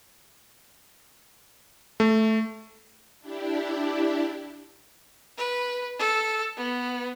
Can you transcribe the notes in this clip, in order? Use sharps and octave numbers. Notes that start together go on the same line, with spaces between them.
A3
D4 E4 G4
B4
A4
B3